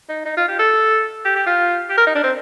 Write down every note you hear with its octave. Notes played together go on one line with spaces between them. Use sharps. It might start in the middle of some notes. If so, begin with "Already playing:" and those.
D#4
D#4
F4
G4
A4
G4
G4
F4
G4
A#4
D#4
D4
C4